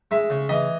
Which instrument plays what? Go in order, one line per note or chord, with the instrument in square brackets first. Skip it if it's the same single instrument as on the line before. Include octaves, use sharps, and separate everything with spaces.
[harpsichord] G#3 [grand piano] E5
[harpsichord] C#3
[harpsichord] E3 [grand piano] D#5